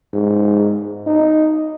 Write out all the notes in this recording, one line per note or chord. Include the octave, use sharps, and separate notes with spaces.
G#2
D#4